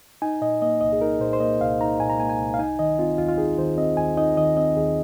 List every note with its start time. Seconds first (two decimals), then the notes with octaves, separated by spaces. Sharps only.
0.22 D#4 G#5
0.41 A#2 D#5
0.62 A#3 D#5
0.81 C2 D#5
0.92 G#4
1.01 D#4 A#4
1.20 A#2 C5
1.33 C5
1.40 A#3 D#5
1.60 C2 F5
1.81 D#4 A#5
2.00 A#2 G#5
2.10 A#5
2.19 A#3 G#5
2.29 G#5
2.39 C2
2.54 F5
2.59 D#4 G#5
2.79 D#3 D#5
2.99 C4 F4
3.18 D#2 F4
3.29 F4
3.38 D#4 G#4
3.58 D#3 C5
3.78 C4 D#5
3.97 D#2 G#5
4.17 D#4 D#5
4.37 D#3 D#5
4.57 C4 D#5
4.77 D#2 G#4